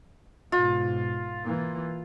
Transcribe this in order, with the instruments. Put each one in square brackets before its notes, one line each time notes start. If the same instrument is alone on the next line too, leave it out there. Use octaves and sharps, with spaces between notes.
[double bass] G#2 B2 [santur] F4
[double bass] E3 A#3